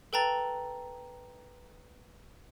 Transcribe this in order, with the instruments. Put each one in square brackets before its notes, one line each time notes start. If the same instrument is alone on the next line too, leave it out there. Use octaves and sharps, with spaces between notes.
[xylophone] A4 B4 G5 A5 A#5 A6